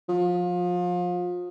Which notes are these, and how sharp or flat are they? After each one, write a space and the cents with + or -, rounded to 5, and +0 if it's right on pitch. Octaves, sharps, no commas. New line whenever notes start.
F3 +30